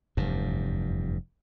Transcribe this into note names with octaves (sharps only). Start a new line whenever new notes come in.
F1 E2 G2